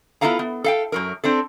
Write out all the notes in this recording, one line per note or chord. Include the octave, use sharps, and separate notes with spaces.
B3 E4 F4 A4 F5 A#5
B3
A4 F5 G5
F#2 F#3 A#4
C4 D4 A4